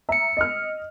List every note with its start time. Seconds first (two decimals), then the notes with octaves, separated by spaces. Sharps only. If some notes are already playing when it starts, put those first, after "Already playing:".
0.09 E5 A#5 E6 C#7
0.37 D#5 F6